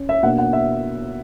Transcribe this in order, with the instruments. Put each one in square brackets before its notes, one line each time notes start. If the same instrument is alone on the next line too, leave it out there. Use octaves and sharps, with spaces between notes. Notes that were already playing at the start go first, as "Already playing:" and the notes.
Already playing: [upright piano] C#4
E5
B2 A#3 D4 F#5
F#5
E5